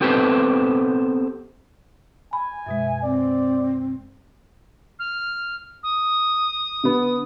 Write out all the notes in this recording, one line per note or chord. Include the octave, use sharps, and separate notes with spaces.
B3 C4 G4 A4 B4 C5
G#5 B5
F#2 B2 G#3 E5
C4 D5
F6
D#6
D3 B3